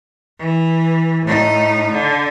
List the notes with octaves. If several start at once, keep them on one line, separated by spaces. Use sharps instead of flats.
E3
A2 D#4
D3